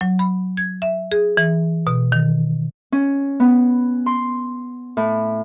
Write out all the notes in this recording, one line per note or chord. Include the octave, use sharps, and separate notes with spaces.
F#3
B5
G#6
E5
G#4
E3
B2
D#3
C#4
B3
C6
A2